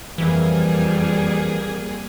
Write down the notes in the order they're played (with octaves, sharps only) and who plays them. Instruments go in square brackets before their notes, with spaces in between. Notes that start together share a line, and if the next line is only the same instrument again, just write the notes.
[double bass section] F2 [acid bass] E3 [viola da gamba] G3 [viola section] A#3 G#4